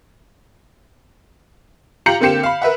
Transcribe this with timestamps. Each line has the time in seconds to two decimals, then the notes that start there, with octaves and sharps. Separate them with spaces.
2.06 F4 G4 A#5 G6 C#7 F#7
2.20 D3 A#3 C4 G4 C#7 E7
2.43 F5 B5
2.62 A#4 B4 E5 F#5